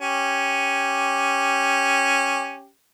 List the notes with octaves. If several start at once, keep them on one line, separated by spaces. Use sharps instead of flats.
C#4 G4